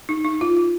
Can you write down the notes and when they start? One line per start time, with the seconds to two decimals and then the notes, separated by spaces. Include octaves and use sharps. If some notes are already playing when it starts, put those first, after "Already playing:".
0.09 D#4
0.24 D#4
0.41 F4
0.57 F4